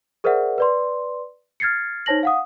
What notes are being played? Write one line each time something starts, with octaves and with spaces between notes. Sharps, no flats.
G#4 A#4 C5 D5 E5 F#5
B4 D5 C6
F6 G#6 A6 C7 C#7
D#4 C5 C#5 A5 A#6 F#7
F5 F#5 D#6